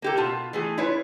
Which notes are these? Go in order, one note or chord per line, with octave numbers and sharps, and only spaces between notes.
A#3 G4 A4
B2 F4 A5
E3 A3 G#4
E4 F4 B4 C#5